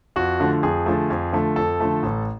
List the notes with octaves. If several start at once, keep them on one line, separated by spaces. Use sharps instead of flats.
F2 F#4
D3 F3 A3
F2 G#4
D3 F3 A3
F2
D3 F3 A3
F2 A4
D3 F3 A3
A1